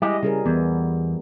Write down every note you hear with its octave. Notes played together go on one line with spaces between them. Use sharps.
G3 G#3 E4 G4 D#5
C#3 G3 G#4 A#4
E2 B3